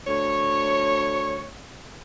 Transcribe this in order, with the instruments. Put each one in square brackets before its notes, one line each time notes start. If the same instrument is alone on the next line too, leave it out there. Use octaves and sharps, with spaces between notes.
[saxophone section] D2 C#5